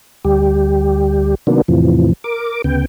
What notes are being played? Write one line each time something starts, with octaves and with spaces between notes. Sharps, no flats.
D2 G3 G4
C3 D#3 F#3 A#3 B3 D4
E2 A2 C3 E3 F3
A#4 D6
D2 C#3 B3 G5